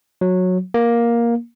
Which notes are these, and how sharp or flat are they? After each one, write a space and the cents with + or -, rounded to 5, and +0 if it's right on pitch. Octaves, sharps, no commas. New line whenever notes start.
F#3 -15
A#3 +10